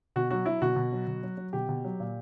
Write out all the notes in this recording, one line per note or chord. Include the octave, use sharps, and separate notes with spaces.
B2 F#4
F#3 F#4
F#3 E4
B2 F#4
B2
F#3
B2
F#3
F#3
B2 G4
B2
F#3
A#2